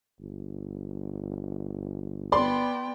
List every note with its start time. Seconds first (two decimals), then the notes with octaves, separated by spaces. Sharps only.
0.20 G1
2.32 B3 D5 G5 B5 C6